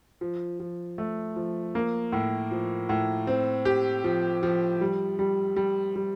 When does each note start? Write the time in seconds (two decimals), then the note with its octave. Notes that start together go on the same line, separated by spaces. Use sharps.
0.21 F3
0.60 F3
0.98 A3
1.36 F3
1.75 A#3
2.12 A2
2.51 F3
2.89 A2
3.27 C4
3.65 G4
4.04 F3
4.43 F3
4.81 G3
5.19 G3
5.56 G3
5.96 G3